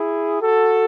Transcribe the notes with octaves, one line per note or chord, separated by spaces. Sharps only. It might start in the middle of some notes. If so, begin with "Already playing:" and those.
Already playing: E4 G#4
F#4 A4